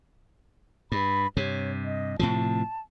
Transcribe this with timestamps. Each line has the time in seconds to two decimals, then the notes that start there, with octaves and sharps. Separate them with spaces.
0.92 G2 B5
1.37 G2 C3 C#5
1.85 D#5
2.19 A2 C3 F3 A5